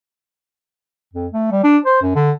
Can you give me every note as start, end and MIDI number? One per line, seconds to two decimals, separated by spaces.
1.14 1.27 41
1.33 1.47 57
1.52 1.61 55
1.64 1.78 62
1.86 1.99 72
2.02 2.13 42
2.15 2.32 50